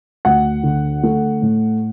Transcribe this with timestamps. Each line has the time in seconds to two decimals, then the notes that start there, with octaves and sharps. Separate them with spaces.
0.25 D2 F#5
0.63 D3
1.03 A3
1.42 A2